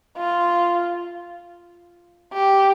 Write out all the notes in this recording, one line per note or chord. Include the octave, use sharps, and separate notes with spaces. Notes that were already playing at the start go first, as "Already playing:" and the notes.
F4
G4